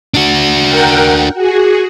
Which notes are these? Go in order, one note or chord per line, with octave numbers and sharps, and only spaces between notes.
D4 F#4
A#4 F#5 G5
F#4 G#4